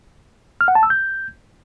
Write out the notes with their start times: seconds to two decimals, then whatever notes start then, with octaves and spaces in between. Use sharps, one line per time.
0.61 F6
0.68 F#5
0.75 A5
0.83 E6
0.90 G6